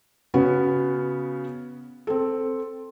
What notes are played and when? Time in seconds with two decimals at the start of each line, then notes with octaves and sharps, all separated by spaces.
0.34 C#3 B3 C#4 F#4
2.07 C4 A4